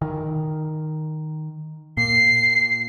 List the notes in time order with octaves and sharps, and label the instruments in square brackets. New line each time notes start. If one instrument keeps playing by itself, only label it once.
[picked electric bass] D#3
[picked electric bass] A#2 [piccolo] C7